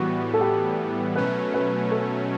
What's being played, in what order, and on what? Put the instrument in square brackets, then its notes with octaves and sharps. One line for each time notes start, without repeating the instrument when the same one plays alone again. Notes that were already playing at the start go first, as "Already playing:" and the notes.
Already playing: [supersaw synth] A2 E3 G3 B3 [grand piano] F#4
[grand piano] A4
G4
[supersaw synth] B2 F#3 A3 C#4 [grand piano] B4
[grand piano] B4
A4